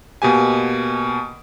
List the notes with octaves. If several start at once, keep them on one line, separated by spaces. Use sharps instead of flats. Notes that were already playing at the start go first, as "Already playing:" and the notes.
B2 A#3 G4 G#5